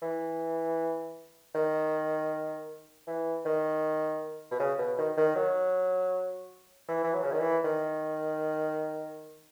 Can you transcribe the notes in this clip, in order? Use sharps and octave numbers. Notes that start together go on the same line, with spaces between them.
E3
D#3
E3
D#3
B2
C#3
B2
D#3
D#3
F#3
E3
E3
F#3
C#3
D#3
E3
D#3